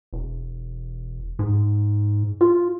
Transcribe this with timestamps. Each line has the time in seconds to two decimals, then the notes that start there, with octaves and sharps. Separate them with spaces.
0.13 E1
1.39 G#2
2.41 F4